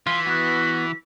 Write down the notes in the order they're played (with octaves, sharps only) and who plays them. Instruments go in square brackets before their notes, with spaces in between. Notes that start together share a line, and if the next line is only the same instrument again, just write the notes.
[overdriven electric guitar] E3 [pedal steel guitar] F4 [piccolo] B6
[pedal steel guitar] B3 [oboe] F#4